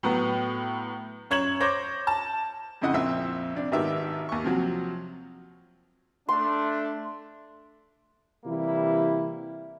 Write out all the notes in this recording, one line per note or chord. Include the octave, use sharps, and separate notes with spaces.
A2 F#3 B3
F#2 C#5 G#6 E7 F#7
C5 C#5 D6 G6 A#6
A5
F2 C#3 E4 D#5 F#5
A#1 F2 C4 E5 E6
C3 D4
G#1 D#3 B3 G4 E5
D#2 C#6
C3 F3 F#3
A3 D4 C6
C3 E3 G3 A#3 E4